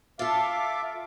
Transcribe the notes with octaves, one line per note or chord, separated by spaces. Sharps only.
F4 A4 E5 F5 D6